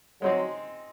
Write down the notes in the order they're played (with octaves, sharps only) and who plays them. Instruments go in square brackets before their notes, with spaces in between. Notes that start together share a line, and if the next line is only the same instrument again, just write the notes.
[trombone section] F#3 [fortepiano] G#3 C4 D#4